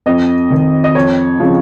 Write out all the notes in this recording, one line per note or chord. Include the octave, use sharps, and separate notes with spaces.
F2 D#5
D#3
D#5
F2 C#5
C#3 F3